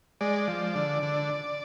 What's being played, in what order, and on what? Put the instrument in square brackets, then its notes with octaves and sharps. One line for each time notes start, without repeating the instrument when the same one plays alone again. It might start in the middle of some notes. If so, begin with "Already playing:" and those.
[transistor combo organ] G#3 D5
F3
D3
D3